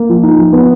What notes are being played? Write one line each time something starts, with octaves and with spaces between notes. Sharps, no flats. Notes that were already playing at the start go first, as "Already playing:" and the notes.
Already playing: A#3
F3
D#4
F3
B3